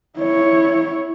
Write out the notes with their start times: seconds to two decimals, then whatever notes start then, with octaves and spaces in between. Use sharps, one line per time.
0.19 E4 C#5